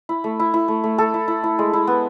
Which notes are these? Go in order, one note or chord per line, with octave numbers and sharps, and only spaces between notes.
E4
A3
E4
E4
A3
A3
A3 A4
E4
E4
E4
G#3
E4
B3